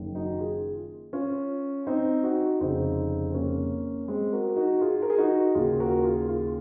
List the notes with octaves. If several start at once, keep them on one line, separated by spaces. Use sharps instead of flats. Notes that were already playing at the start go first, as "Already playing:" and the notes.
Already playing: F#1 F#2 D#3
D#4 F#4
F4 G#4
C#4 F4
C4 D#4
D#4 F#4
F1 F2 C#3 C4 D#4
A#3 C#4
G#3 C4
F#4 A#4
D#4 F#4
F4 G#4
A#4
G#4
D#4 F#4
D#2 C#3 F4 G#4
F#4 A#4
F4 G#4
F4 G#4